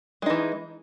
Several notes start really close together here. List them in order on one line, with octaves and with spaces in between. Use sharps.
G#3 D#4 E3